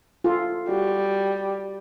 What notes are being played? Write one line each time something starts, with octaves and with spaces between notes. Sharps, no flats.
F4 A4
G3 F#4